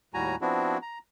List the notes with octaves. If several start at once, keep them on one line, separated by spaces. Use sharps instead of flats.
D#2 A2 G3 F#4 G#5 A#5
F3 B3 C4 D4 E4 F#4
A#5